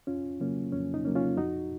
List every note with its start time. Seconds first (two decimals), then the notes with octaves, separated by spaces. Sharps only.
0.07 F2 C#4 F4
0.40 C#3 F#3 A#3 C#4
0.72 F2 C#4
0.94 D#4
1.05 C#3 F#3 A#3 C#4
1.16 C#4 F4
1.38 F2 D#4 F#4